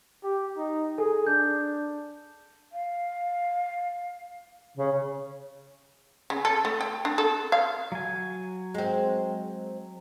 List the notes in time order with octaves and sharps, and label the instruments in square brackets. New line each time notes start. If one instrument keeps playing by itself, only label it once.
[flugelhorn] G4
D#4
[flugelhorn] G#4 [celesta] A4
[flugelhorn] D4 [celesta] G6
[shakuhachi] F5
[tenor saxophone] C#3
[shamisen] C#3
A4
A3
G5
D4
A4
F5
[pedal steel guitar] F#3 G#5
[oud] G#3 C4